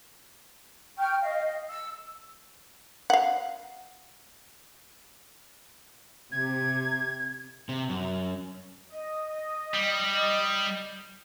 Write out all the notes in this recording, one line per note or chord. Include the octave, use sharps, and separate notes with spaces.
G5 C#6 F6 G6
D#5 F5
E6
F5 F#5
C3 G#6
C3
F#2
D#5
G3